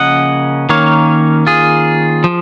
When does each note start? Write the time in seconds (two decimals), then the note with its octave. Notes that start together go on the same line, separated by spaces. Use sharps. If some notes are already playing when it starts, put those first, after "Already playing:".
Already playing: C#3 F3 A#3 C#4 D#5 F#5
0.69 D#3 A#3 C#4 C#5 F5
1.47 F4 G#4
2.24 F3